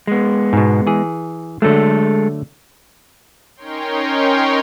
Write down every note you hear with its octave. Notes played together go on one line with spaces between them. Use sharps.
G#3 B3
G#2 B2
E3 G#4
D3 F#3 G#3 A3 A4
C#4 D#4 A#4 C#5 G5 C6